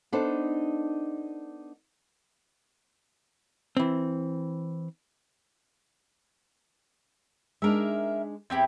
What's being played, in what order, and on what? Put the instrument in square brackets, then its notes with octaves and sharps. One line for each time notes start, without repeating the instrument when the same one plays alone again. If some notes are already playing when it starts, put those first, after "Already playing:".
[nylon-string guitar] B3 D4 D#4 A4 C5
[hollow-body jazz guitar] E3 C4
[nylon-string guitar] G#3 D4 D#4 [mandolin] A#4 E5
[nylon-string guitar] E2 [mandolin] C4 E4 G4